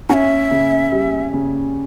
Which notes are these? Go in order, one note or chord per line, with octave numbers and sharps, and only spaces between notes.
C#4 E5 F#5
C#3
G3
C#3